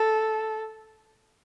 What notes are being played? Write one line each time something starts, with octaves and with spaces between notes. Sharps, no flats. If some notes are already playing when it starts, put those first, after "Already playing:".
Already playing: A4